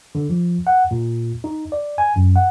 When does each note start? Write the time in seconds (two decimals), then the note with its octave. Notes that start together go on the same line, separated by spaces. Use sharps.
0.15 D3
0.30 F3
0.67 F#5
0.91 A#2
1.44 D#4
1.72 D5
1.98 G#5
2.16 F#2
2.36 F#5